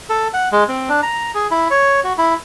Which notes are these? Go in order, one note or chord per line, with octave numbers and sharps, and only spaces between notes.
A4
F#5
G#3
C4
D4
A#5
G#4
E4
C#5
F#4
E4